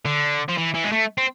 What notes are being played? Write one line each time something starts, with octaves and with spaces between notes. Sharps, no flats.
D3
F3
E3
E3
G#3
A3
C4